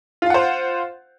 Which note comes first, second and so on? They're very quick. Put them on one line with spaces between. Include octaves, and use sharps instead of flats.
F4 F5 F#5 C5